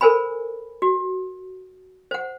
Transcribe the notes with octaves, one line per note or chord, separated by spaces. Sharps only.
A4 A#4 C5 G#5 B5
F#4
C5 F#5